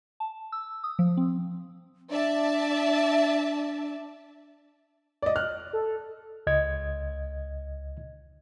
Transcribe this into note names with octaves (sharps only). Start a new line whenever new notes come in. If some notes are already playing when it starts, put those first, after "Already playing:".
A5
E6
D#6
F3
C4
D4 D5 E5 A5
D5 D#5
F6 F#6
A4
C#2 D#5 G#6